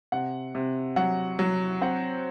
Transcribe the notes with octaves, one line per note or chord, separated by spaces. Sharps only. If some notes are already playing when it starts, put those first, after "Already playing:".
C3 F#5
C3
F#3 F#5
F#3
C4 F#5